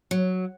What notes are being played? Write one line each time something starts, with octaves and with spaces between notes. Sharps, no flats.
F#3